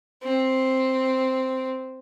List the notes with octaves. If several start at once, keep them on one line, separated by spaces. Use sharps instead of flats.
C4